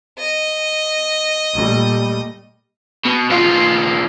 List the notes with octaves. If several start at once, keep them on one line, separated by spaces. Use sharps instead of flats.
D#5
A#2 G3 A3
B2
B1 F4